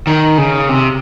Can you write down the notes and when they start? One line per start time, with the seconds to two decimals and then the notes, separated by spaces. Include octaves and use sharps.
0.07 D#3
0.38 C#3
0.69 C3